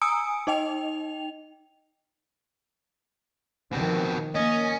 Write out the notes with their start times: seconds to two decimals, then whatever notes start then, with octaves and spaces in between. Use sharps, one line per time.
0.01 G#5 A#5 D#6 E6 C#7 D7
0.47 D#4 D#5 G5 F7
3.73 B2 D#3 F3 C4
4.35 A#3 C#4 D#5